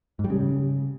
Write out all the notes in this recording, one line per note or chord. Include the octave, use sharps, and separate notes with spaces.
G#2
G3
C#3